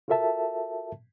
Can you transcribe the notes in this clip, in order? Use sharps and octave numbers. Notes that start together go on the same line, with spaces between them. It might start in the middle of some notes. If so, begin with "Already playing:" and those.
F4 F#4 A4 A#4 E5 A5